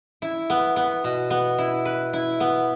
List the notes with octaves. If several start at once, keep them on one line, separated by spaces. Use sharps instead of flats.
E4
B3
B3
B2
B3
E4
B4
E4
B3